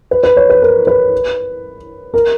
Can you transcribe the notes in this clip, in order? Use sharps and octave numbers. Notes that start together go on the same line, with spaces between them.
B4
B4
C#5
B4
A#4
B4
A#4